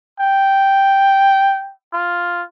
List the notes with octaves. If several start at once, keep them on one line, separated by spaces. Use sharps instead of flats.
G5
F4